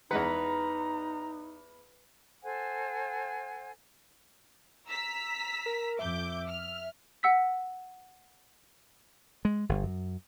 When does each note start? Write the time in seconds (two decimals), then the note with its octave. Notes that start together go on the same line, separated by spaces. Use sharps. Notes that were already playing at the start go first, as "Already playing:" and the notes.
0.11 E2 G#3 D#4 B4 F#5 A#5
2.43 A4 C5 F#5 G#5
4.88 A#5 E6 B6
5.66 A#4
5.99 F2 E5 D6 G6
6.46 F6
7.23 F#5 E6 B6
9.45 G#3
9.69 G1
9.83 F#2